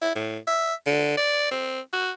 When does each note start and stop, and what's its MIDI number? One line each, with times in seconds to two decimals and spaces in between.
0.02 0.12 64
0.15 0.37 45
0.47 0.74 76
0.86 1.14 50
1.17 1.49 74
1.51 1.80 60
1.93 2.11 66